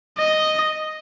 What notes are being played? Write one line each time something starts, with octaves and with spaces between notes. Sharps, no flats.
D#5